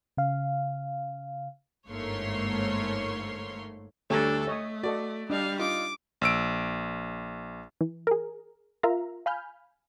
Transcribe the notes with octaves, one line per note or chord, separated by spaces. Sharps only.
C#3 F5
G1 G#2 A3 A#3 C#5 C6
D2 G3 A3 D4 A4 C#5 G#5 A#5
A3 C#5 D#5 C#6 D#6
F#4 A4 D5 D#5
G3 D4 D#5 F5
D#4 F4 D6
A#1 E6 D7
E3
G#4 A#4
F4 A#4 E5 F5 A#5
F5 G#5 B5 F6 G6